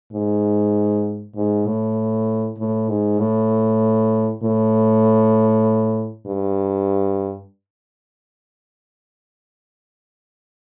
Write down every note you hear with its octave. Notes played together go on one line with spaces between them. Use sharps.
G#2
G#2
A2
A2
G#2
A2
A2
G2